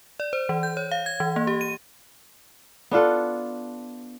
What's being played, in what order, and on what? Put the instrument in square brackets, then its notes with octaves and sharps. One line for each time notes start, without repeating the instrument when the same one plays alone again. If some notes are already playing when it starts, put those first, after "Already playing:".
[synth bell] D5
C5
E3
G6
C#5
F5
G#6
E3
A#3
G4
D#7
[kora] B3 D4 F4 A4